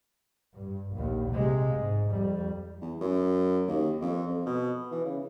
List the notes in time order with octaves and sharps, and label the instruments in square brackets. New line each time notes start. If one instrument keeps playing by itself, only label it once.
[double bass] G2
A#1 D#2
C3 G#3
G#2
F2 G3
[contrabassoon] E2
F#2
D#2
F2
F2
B2
E3
C#3